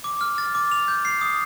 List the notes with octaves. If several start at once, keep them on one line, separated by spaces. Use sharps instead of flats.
D6
F6
A6
D6
F7
G6
C7
D#6